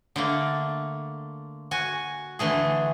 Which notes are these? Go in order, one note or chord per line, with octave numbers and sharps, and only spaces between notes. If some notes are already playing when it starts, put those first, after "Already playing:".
D3 A3 A#3
F#4 G#5
D3 E3 A3 G#4